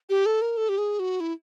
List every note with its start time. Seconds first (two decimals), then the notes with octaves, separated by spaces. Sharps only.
0.09 G4
0.26 A4
0.42 A#4
0.57 A4
0.69 G4
0.78 G#4
0.99 F#4
1.20 E4